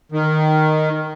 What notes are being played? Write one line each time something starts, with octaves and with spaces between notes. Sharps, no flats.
D#3